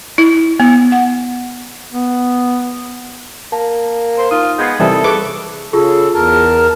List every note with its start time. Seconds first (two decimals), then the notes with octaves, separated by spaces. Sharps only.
0.18 E4
0.60 B3
0.92 F#5
1.92 B3
3.52 A#3 A5
4.18 C5
4.31 D#4 F4 D#6 D#7
4.58 G#3 B3 G6 G#6 C7
4.80 D#2 C3 E3 G3 A4 E5 D#6
5.04 G#4 A#4 B4 C#6 D6
5.73 C#3 F4 G#4 A4
6.14 E2 A#4 A5